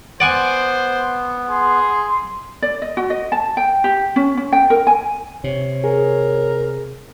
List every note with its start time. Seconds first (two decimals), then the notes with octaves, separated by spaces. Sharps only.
0.20 B3 C5 D5 F#5 G#5
1.50 G#4 C6
2.62 D5
2.82 D#5
2.97 F#4
3.10 D#5
3.32 A5
3.57 G5
3.84 G4
4.16 C#4
4.37 C#4
4.53 G5
4.70 A#4
4.87 G#5
5.44 C3 C#5
5.84 G#4 A#4